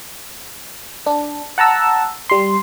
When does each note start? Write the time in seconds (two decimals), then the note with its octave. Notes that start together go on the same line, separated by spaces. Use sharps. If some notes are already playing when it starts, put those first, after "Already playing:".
1.06 D4
1.58 F#5 A5 A#5 E6
2.29 G3 C6